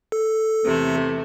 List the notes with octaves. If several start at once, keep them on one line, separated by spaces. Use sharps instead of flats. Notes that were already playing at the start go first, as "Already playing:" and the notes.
A4
E2 C3 A3